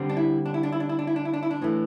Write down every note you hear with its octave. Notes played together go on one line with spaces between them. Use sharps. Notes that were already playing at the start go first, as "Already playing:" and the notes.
Already playing: D3 G3 C4
D4
E4
D4
E4
D4
E4
D4
E4
D4
E4
D4
E4
D4
E4
D4
A2 E3 A3